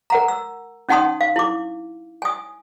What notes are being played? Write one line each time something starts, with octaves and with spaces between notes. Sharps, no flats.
A#4 F#5 A#5
E6
C#4 D#4 F#5 A5 C6 D#6
F5
E4 D6
G#5 D#6